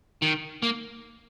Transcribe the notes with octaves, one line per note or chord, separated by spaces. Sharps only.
D#3
A#3